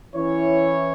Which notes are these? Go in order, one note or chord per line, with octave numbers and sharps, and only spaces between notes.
E3 C#4 E4 C#5